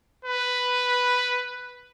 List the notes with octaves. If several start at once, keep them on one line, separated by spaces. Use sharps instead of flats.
B4